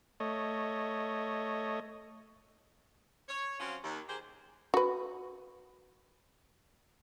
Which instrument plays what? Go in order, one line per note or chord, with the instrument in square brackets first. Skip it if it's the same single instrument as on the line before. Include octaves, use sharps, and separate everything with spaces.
[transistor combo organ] A3 C#5 D#5
[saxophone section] C#5
F3 F#3 C4 C#4 F4
D#2
G4 G#4 A#4 C5
[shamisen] F#4 B4